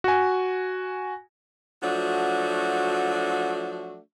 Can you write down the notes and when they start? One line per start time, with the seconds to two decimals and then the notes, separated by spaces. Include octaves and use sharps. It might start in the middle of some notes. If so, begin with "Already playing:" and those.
0.04 F#4 G#5
1.82 F3 F#3 A3 D4 F#4